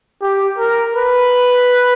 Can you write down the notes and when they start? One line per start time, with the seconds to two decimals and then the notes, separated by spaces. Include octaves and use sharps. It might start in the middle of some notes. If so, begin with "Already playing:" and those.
0.22 G4
0.58 A#4
0.95 B4